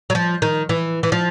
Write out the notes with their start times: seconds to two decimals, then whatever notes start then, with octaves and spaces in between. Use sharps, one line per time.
0.10 F#3
0.15 F3
0.42 D#3
0.69 E3
1.03 E3
1.12 F3